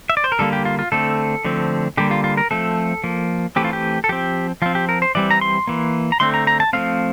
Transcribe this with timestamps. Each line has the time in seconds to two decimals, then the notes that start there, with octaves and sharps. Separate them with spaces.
0.10 E5
0.17 D5
0.24 C5
0.32 A#4
0.39 D3 G3 A#3 A4
0.53 G4
0.65 F4
0.79 F4
0.92 D3 A3 C4 A4
1.45 D3 F3 A3 C4
1.97 D3 G3 A#3 G4
2.11 F4
2.24 F4
2.37 A#4
2.51 F3 A3 C4 A4
3.04 F3 A#3
3.56 E3 A3 C4 G4
3.65 F4
3.73 G4
4.04 A4
4.09 F3 C4 G4
4.62 F3 C4 F4
4.75 G4
4.89 A#4
5.02 C5
5.15 E3 G3 C4 D5
5.31 A#5
5.41 C6
5.67 E3 A#3
6.12 A#5
6.20 D3 A3 C4 C6
6.34 A#5
6.47 A#5
6.60 A5
6.73 F3 A3 C4 F5